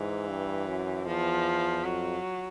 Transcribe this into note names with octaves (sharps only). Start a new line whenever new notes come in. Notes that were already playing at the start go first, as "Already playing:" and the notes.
Already playing: G#2 E3
G2
F#2
E2 F3
F2 F#3